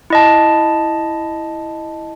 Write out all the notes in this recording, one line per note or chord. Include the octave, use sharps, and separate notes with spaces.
E4 D#5 A5